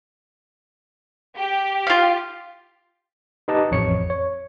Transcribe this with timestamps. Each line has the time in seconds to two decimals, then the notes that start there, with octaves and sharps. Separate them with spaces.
1.37 G4
1.87 F4 F5
3.48 D#4 G4 B4 D#5 A5
3.71 A1 F2 C#5 C#7
4.10 C#5